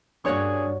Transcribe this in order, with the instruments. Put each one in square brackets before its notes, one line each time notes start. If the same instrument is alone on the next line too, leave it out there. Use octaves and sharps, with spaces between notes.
[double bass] G2 [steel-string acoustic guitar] A#3 D4 [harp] F#4 C#5 C#6 [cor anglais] G#4